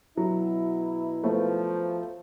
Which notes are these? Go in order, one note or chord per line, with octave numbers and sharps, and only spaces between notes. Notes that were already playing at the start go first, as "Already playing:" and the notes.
B2 F#3 E4
F3 A3 B3 C#5